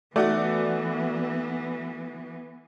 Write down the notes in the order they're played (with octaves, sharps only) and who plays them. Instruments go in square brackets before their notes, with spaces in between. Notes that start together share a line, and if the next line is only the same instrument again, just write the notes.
[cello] E3 B3 [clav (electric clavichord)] A3 [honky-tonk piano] D#4 F#4 D5